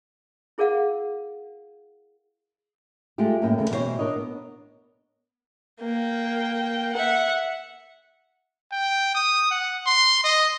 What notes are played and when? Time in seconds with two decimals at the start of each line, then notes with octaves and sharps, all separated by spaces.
0.58 E4 G#4 A#4 D5 F5 F#5
3.18 G#3 A3 F4 G4
3.42 F#2 A2 A#3 B3 G5
3.58 D#2 C#3 A3 A#3
3.70 B2 E3 G3 F4 C5 C#5
3.99 D4 A#4 C#5 D#5
4.16 B3
5.81 A#3 G5
6.93 E5 F#5
8.72 G5
9.15 D#6
9.51 F#5
9.87 C6
10.24 D#5